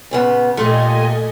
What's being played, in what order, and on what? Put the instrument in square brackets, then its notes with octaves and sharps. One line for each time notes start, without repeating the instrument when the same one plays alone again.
[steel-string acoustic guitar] A#2 C#3 B3
[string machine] A#2 D#5 G#5 [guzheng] A3 [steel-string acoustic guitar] F4 G4